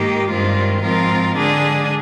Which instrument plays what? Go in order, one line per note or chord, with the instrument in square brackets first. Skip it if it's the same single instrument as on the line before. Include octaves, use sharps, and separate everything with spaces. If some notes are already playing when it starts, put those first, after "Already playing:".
Already playing: [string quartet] G#2 D#3 A#3 D#4 G4
G2 D#3 G#3 C4 F4
G#2 F3 C4 F4 A#4
D3 G#3 D4 G#4